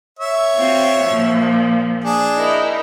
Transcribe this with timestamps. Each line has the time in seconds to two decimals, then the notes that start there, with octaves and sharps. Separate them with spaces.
0.19 C#5 E5
0.56 C4 F4 F#4
1.04 A#2 F3
2.04 D4 G#4
2.36 D#4 E4 A#4